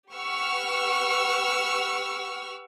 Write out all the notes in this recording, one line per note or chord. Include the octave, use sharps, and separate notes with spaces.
G4 B4 F#5 C#6 E6 F6